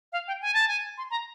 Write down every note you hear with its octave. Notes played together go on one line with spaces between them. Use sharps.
F5
G5
G#5
A5
G#5
C6
A#5